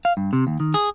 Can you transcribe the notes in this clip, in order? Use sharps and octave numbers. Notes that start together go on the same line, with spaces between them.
F5
G2
C3
D#2
D#3
G#4